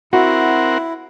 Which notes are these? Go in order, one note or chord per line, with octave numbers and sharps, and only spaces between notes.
C4 E4 F#4 A#4 F#5